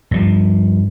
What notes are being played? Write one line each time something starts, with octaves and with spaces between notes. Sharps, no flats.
G2 F3